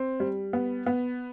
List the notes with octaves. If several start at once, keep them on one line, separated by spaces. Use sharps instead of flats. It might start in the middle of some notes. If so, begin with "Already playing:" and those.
Already playing: C4
G3
B3
B3